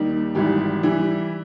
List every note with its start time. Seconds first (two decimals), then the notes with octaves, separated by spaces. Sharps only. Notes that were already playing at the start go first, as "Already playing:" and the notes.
Already playing: D#2 D#3 G3 G4
0.35 G#1 G#2 E3 G3 G4
0.83 E3 G3